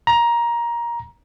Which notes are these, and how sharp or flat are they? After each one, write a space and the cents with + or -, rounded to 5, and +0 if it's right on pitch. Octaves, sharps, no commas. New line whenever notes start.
A#5 +15